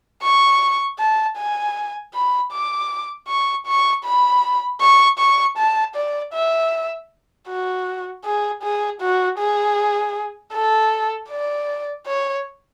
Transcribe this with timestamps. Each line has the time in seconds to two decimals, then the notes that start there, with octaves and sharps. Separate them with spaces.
0.23 C#6
0.99 A5
1.37 G#5
2.14 B5
2.52 D6
3.28 C#6
3.66 C#6
4.04 B5
4.81 C#6
5.19 C#6
5.57 A5
5.95 D5
6.33 E5
7.48 F#4
8.24 G#4
8.63 G#4
9.01 F#4
9.39 G#4
10.53 A4
11.30 D5
12.06 C#5